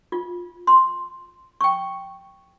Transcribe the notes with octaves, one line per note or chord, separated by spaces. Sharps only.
F4
C6
G5 C#6